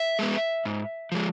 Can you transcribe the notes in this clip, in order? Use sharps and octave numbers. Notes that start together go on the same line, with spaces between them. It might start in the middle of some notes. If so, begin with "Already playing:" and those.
Already playing: E5
G#3 B3
G#2
F3 G#3